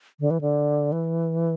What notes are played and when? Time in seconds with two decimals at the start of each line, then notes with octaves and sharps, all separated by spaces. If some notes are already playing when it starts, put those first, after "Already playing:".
0.20 D3
0.31 E3
0.41 D3
0.92 E3